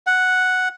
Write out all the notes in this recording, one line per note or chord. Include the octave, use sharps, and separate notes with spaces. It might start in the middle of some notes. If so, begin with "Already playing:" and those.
F#5